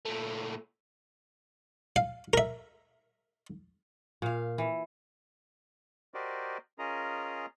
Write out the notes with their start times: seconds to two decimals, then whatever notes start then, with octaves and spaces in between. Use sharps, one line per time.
0.06 A#2 A3
1.96 F5
2.33 A#4 E5
4.22 A#2 F5
4.58 E3
6.14 F#4 G4 A#4 C5 D5 D#5
6.79 C#4 F4 G#4 A#4 D#5 A#5